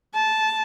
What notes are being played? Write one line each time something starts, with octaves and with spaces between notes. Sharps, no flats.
A5